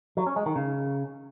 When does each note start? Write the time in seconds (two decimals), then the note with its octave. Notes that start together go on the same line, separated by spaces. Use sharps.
0.17 F#3
0.27 C#4
0.36 G#3
0.46 D#3
0.56 C#3